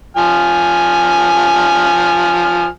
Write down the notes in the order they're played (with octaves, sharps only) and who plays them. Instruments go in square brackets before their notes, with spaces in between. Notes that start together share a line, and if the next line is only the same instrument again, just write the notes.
[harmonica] F3 G#5 F6